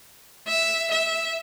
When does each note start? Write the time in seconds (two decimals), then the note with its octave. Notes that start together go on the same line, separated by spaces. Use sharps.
0.48 E5
0.91 E5